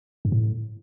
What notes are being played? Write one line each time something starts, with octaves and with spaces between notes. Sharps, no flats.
G2
A2